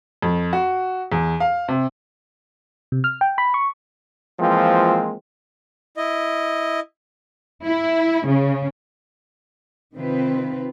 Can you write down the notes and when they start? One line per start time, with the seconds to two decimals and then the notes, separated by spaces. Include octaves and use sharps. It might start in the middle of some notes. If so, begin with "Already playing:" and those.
0.22 F2
0.53 F#4
1.12 E2
1.40 F5
1.68 C3
2.92 C3
3.04 F6
3.21 G5
3.38 B5
3.54 C#6
4.40 E3 F3 G#3 A#3 C4 F4
5.97 E4 D#5
7.66 E4
8.27 C#3
9.94 C3 D#3 C4 F4 B4